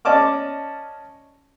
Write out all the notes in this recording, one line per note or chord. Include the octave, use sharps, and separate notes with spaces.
C#4 D5 D#5 A5 D6 F6